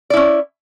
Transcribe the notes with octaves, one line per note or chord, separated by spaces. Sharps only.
C#4 E4 D5